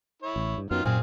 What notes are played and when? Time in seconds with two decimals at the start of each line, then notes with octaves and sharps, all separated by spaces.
0.22 E4 C#5
0.36 A1
0.58 G2
0.71 F#2 D#3 F#3 B3 F4 F6
0.85 F#2 A#2 C4 G#4 F5